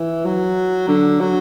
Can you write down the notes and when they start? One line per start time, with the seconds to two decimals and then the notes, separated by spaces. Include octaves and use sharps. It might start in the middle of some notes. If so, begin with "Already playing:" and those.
Already playing: E3
0.25 F#3
0.88 D3
1.20 F#3